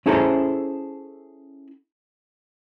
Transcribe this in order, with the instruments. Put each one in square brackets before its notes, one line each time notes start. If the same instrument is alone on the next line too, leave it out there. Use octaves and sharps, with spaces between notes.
[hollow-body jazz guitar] C#4 E4 G#4 A4 C5 A#5